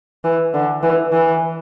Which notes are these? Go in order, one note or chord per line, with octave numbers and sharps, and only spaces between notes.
E3
D3
E3
E3